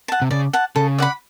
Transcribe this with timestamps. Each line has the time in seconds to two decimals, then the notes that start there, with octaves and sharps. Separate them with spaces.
0.08 F#5 A5
0.22 C3
0.31 C#3 D5
0.53 F#5 A5
0.76 C#3 A4
0.98 D5 F#5 B5